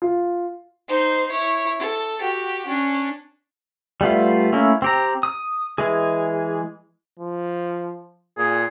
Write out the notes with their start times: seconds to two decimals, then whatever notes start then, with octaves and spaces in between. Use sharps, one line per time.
0.02 F4
0.88 D#4 C5
1.31 E4 C#5
1.80 A4
2.21 F#4 G4
2.66 C#4 D4
4.01 G3 A3 B3 F4
4.52 A3 A#3 C#4 E4
4.82 C4 G4 A#5
5.23 D#6
5.78 E3 G#3 G#4
7.19 F3
8.38 A#2 G#4